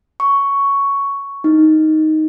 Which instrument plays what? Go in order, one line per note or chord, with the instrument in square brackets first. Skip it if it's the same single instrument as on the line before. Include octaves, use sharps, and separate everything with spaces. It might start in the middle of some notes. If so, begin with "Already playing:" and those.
[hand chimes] C#6
D#4